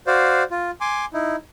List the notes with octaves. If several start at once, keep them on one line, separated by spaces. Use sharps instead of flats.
F#4 C5 D5 F5
F4
G#5 C6 D6
D#4 E4